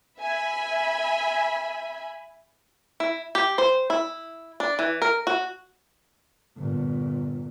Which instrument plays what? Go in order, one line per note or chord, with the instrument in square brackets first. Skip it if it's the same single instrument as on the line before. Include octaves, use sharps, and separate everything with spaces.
[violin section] E5 G#5 B5
[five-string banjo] E4
G4
C5
E4
D4
E3
A#4
F#4
[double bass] G1 A#2